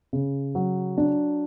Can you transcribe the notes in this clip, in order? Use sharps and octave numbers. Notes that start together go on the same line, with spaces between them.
C#3
F#3
D4